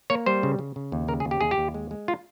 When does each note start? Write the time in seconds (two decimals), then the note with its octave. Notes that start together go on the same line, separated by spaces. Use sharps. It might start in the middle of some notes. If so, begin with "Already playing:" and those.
0.10 A#3 C#5
0.26 G3 C5
0.43 C#3
0.59 C#3
0.76 C#3
0.92 D#2
1.08 C#3 A#4
1.20 G#4
1.25 D#2
1.31 G4
1.41 D#2 G#4
1.51 G4
1.58 D#2
1.74 G#3
1.91 G#3
2.08 F4